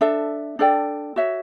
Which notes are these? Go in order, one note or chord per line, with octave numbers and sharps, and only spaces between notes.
D4 A4 E5
D4 A4 D5 G5
F#4 C#5 E5